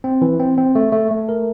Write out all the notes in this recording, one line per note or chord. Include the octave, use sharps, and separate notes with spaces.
C4
E3
C4
C4
A3
A3
A3
A#4